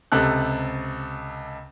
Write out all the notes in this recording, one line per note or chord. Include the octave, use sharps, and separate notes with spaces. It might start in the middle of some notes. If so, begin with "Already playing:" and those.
C#2 C3 A4 F#6